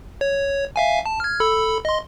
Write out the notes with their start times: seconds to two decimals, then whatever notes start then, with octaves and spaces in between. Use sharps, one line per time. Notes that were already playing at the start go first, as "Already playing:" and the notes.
0.21 C#5
0.76 E5 F5 G#5
1.06 A5
1.20 F6 G#6
1.40 A4 B5 E6
1.85 D#5 C6